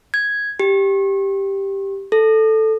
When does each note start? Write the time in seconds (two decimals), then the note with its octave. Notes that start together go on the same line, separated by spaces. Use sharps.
0.14 G#6
0.60 G4
2.12 A4